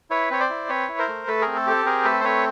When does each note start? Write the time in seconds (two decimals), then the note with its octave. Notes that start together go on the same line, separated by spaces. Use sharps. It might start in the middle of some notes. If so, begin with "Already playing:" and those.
0.10 E4 B4 C#5
0.31 C4 C#5
0.40 C5 D5
0.49 E4
0.69 C4 B4 C#5
0.89 E4
0.99 A#4 C5
1.08 A3
1.27 A3 A4 B4
1.41 C4 G#4 A#4
1.56 A4
1.67 G4 A4
1.85 C4 G#4 A#4
2.04 A3 A4 B4
2.20 C5
2.24 C4 B4 C#5